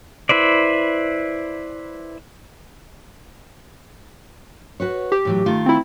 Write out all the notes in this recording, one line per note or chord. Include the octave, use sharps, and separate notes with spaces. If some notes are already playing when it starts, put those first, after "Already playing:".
E4 B4 C5 D5
F#4 B4 C#5
G4
A2 E3 F#3
D#3 A3 F4
C4 E4